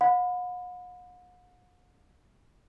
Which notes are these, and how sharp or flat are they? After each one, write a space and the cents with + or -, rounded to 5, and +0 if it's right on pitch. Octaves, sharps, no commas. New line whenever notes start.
F#5 -45 B5 +25